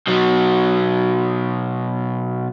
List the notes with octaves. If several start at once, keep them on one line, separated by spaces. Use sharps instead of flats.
B2 F#3